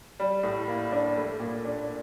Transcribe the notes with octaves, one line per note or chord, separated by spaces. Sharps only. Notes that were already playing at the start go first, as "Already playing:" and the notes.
G3
A2
A#3
D4
A3
A#2
D4